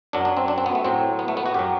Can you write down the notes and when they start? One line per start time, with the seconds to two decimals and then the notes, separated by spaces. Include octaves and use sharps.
0.13 F#2 F#3 D4
0.25 D4
0.37 C4
0.48 D4
0.58 C4
0.66 B3
0.75 A3
0.85 A2 F#3 C4
1.19 B3
1.28 A3
1.37 B3
1.46 F#4
1.54 F#2 F#3 G4